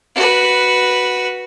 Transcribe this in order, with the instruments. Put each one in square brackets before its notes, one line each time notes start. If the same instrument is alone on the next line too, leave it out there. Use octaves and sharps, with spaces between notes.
[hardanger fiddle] F#4 B4